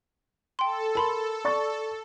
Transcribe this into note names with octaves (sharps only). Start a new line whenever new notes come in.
A4 G5 C6
A#4 A5 B5 C6
D5 C#6 A6